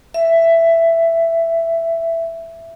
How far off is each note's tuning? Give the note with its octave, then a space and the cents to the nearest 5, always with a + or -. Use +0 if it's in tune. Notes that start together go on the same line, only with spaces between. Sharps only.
E5 +10